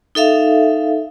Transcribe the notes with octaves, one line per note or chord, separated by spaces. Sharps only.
D#4 A4 E5 F5